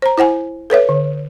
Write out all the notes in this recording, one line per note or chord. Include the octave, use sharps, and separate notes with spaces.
C5 A#5
E4 C5 F#5 G#5
A4 B4 C#5 E5
D3